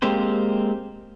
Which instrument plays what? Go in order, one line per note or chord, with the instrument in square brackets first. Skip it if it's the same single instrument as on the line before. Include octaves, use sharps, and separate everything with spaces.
[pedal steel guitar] G#3 A#3 C4 G4 C5